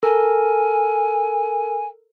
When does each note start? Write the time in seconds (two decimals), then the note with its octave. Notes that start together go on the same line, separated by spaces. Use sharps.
0.03 A4 A#4 G#5